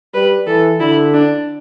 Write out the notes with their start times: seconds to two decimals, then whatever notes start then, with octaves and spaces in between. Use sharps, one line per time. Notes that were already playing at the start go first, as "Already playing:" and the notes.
0.14 G3 B4
0.47 E3 A4
0.80 D3 E4
1.13 D4